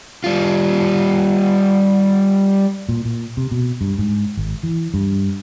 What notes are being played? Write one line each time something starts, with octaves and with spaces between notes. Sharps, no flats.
G3 F4
A#2
A#2
C3
B2
G2
G#2
G#1
E3
G2